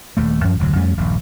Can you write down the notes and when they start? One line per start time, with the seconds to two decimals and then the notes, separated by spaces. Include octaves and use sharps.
0.17 D#1 D#2 A3
0.44 F#2 F3 C#4
0.59 F1 D2 G#2 F#3
0.76 F2 G3 A3 C#4
0.97 D#1 A#1 G2